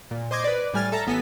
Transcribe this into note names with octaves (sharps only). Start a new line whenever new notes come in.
A#2
C5 D#5 C6 D6 G#6 A#6
B4 D5
A2 G3 G#5 F6 A6
A4 E5 A5 A#5
A1 B3 A4 G#5 B6